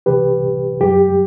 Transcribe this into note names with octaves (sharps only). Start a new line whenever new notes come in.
C2 C3 E3 G4 B4
F#2 F#3 G4